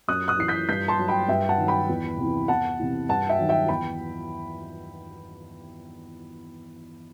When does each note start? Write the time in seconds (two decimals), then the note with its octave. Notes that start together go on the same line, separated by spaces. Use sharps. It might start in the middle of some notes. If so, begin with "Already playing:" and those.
0.08 F#2 D#6 F#6
0.28 D#6 F#6
0.39 E3 C7
0.48 G6 B6
0.69 G2 G6 B6
0.88 A5 C6
0.99 F#3
1.08 G5 B5
1.28 G2 E5 G5
1.49 F#5 A5
1.58 D#3 F#3
1.68 G5 B5
1.89 E2
2.18 C3
2.24 E3
2.48 E2 F#5 A5
2.80 C3 E3
3.09 G2 F#5 A5
3.29 E5 G5
3.39 D#3 F#3
3.49 E5 G5
3.69 E2 G5 B5